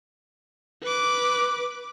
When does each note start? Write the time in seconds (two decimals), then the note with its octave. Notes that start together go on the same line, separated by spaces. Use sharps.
0.83 B4 D6